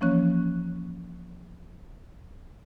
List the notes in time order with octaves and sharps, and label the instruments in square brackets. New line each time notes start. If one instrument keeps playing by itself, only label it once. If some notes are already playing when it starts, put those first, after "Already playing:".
[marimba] E3 F3 A#3 C#4 C#5 F#6